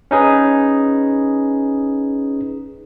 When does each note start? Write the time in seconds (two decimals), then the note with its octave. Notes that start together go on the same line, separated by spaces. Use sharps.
0.11 C#4 D#4 G#4 B4